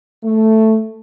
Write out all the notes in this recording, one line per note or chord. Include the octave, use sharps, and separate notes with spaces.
A3